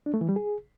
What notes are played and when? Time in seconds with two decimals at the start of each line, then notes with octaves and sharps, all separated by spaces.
0.06 D4
0.14 A3
0.21 E3
0.29 G3
0.36 G#4